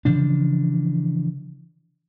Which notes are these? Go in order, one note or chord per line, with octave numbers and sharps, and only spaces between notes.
C#3 E3 F3 D4